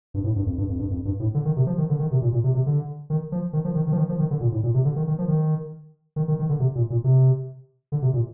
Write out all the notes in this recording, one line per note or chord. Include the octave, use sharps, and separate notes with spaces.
G2
A2
G2
F2
G2
F2
G2
F2
G2
A2
D3
D#3
C3
F3
D#3
D3
D#3
C3
A#2
A#2
C3
C3
D3
D#3
F3
D#3
F3
D#3
D#3
F3
D#3
F3
D#3
D3
A#2
A2
A#2
C3
D3
D#3
D#3
F3
D#3
D#3
D#3
D#3
D3
C3
A#2
A#2
C3
D3
C3
A#2